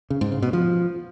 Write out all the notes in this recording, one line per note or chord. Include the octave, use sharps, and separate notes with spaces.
C#3
G#2
C#3
B2
F3